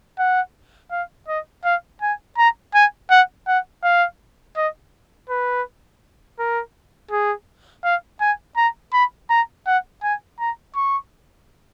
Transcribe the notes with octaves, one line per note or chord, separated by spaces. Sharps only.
F#5
F5
D#5
F5
G#5
A#5
G#5
F#5
F#5
F5
D#5
B4
A#4
G#4
F5
G#5
A#5
B5
A#5
F#5
G#5
A#5
C#6